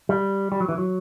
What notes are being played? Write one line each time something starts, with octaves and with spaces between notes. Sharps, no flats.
G3
G3
F#3
E3
F#3